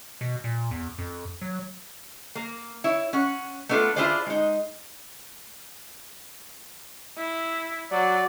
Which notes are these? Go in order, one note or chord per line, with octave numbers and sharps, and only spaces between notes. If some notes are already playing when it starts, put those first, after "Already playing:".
B2
A#2
E2
F2
F#3
A#3
E4 C#5
C#4 F#5
A3 B3 D4 F4 A4
D4 E4 F4 G#4 C5 D5
G#3 D#4
E4
F#3 D5